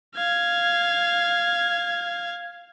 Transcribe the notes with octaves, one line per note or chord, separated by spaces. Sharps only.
F5 G#6